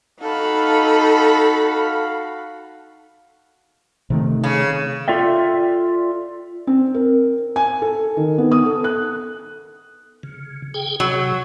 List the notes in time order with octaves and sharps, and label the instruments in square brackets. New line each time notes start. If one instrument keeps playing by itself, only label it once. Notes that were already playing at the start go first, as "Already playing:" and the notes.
[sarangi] D#4 [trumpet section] F#4 F5 [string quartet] A4 B5
[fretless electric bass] C3 D#3 A3
[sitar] C#3
[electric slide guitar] F4 A4 D5 E5 G5
[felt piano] C4
A#4
G#5
A4
D#3
B3
D#6
A4
F#6
[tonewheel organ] C#3
G#4 G5
[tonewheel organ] C3 [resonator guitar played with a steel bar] F#3